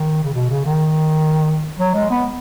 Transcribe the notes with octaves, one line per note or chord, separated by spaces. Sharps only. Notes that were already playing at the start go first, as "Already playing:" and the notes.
Already playing: D#3
C#3
B2
C#3
D#3
F#3
G#3
B3